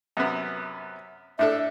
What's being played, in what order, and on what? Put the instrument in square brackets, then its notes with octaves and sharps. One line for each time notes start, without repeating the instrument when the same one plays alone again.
[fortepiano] F#2 C3 B3
[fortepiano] A2 D4 A4 [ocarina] E5